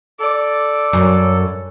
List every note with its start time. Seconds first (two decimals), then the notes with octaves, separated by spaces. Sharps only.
0.19 A4 D5
0.93 F#2